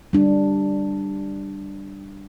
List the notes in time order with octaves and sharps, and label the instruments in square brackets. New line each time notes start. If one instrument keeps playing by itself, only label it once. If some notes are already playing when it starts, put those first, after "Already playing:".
[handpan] G3 D4